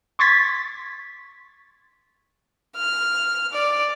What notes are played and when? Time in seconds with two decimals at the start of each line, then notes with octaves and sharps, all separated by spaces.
0.19 C6 C#6 G#6 A6 B6
2.76 F6
3.53 D5